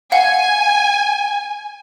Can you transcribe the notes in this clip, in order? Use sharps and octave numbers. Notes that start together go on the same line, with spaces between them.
F5 F#5 G#5